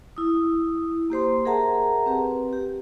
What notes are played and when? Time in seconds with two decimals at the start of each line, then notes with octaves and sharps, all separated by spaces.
0.17 E4 D#6
1.10 A#3 G4 C5 C6
1.45 G#4 A#4 E5 F#5 A5 A#5
2.06 C4 G4 B4
2.53 G4